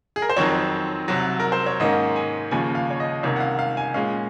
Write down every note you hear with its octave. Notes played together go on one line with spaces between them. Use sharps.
G#4
A#4
C5
F2 D#3 F#3 C4 C#5
C2 C3 F#3
A#4
C5
C#5
G#2 D#3 A#3 C#4 D#5
G#5
D#2 C#3 F3 G#5
F5
C#5
D#5
C2 C3 D#3 A#3 C#4 C#5
F#5
F5
F5
G#5
A#2 G#3 C#4 F5